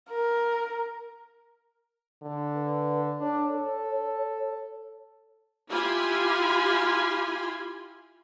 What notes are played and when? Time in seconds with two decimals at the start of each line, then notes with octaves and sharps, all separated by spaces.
0.10 A#4
2.23 D3
2.55 B4
3.21 D4 C#5
3.52 A4
5.70 E4 F4 G4 G#5 B5 C6